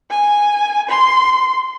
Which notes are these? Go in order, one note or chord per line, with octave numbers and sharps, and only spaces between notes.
G#5
C6